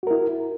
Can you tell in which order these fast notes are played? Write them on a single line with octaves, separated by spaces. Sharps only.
F#4 A#4 E4